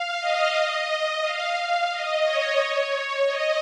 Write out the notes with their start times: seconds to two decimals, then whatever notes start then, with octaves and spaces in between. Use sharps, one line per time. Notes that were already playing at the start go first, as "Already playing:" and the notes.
Already playing: F5
0.20 D#5
1.22 F5
1.57 F5
1.91 D#5
2.24 C#5
3.26 D#5